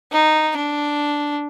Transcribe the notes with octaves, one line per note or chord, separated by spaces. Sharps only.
D#4
D4